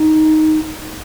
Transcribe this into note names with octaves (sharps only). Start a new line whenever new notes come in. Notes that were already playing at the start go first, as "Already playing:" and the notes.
Already playing: D#4